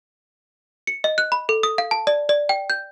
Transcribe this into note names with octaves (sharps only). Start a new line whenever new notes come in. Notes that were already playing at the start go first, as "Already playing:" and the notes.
C#7
D#5
F#6
B5
A4
D#6
F5
A5
D5
D5
G5
G6